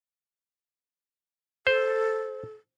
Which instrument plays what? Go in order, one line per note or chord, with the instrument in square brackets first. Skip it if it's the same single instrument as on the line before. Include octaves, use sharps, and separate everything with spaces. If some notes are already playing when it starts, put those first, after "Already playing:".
[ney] A4 [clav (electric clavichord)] C5